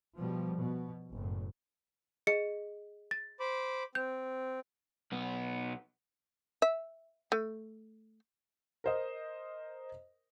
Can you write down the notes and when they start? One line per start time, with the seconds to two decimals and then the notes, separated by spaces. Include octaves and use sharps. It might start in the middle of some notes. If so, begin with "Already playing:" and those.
0.17 B2 F3 G3
0.56 B2
1.12 F#1 A2
2.27 G#4 D#5 C#7
3.11 A6
3.40 C5 B5 D6
3.95 C4 G6
5.12 B1 B3
6.62 E5
7.32 A3
8.84 A#4 C5 D#5